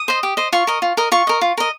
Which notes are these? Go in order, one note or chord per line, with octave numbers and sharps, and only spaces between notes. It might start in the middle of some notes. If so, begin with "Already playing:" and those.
Already playing: D#6
C5 D#5
G4
C5 D#5
F4 C#6
A#4 D#5
F4
A#4 D#5
F4 C#6
A#4 D#5
F4
A#4 D#5